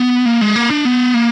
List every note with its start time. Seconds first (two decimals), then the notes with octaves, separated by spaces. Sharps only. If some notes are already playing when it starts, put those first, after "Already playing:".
Already playing: B3
0.26 A#3
0.41 G#3
0.56 A#3
0.70 D4
0.85 B3
1.14 A#3